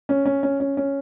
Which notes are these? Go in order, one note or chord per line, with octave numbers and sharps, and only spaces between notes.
C#4
C#4
C#4
C#4
C#4